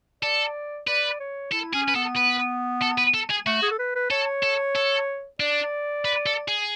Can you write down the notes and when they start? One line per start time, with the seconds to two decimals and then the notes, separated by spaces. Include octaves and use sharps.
0.23 A4 D5
0.87 B4 D5
1.20 C#5
1.52 E4 A4
1.74 C#4 G#4
1.89 B4
1.95 B3 A4
2.17 B4
2.82 A4
2.98 B4
3.14 A4
3.30 G#4
3.46 A3 F#4
3.62 G#4
3.71 A4
3.79 B4
3.95 B4
4.11 A4 C#5
4.43 A4
4.76 A4
5.40 D4 D5
6.05 B4
6.26 A4
6.48 G#4